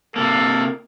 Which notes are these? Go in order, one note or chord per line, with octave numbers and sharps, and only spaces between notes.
C3 A#3 A4